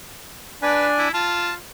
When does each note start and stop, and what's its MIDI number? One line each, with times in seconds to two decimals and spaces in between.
0.63 1.08 62
0.63 0.88 71
0.63 1.08 74
0.63 1.08 80
0.99 1.10 64
1.14 1.55 65
1.14 1.54 81